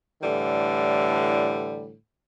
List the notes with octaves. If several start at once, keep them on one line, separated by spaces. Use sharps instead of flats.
A2 D3 E3 G3